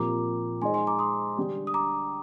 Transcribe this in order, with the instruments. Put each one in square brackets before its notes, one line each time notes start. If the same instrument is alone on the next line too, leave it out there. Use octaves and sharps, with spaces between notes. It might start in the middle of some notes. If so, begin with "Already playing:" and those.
Already playing: [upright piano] A#2 F3 C4 G4 A#4 [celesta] A#5 D6
[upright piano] G#3 D#4 G#4 C5 D#5 [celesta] G#5 C6
[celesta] G#5 C6
A#5 D6
C6 D#6
[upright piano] D3 G3 D4 G4
[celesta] D#6
A#5 D6